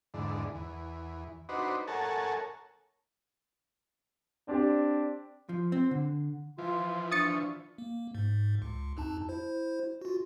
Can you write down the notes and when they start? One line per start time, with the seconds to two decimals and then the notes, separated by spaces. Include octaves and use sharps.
0.14 E2 G#2 D3
0.55 E2
1.49 D4 D#4 F#4 B4 C5
1.87 A4 A#4 C#5 F#5 G#5 A5
4.48 C4 D4 G4
5.49 F3
5.72 C4
5.91 D3
6.58 E3 F3 F4 C6
7.12 D4 C#6 D#6 A6 C#7
7.78 A#3
8.15 G#2
8.62 C#2
8.97 F2 D#4 A5
9.29 E4 C5
10.02 F4 F#4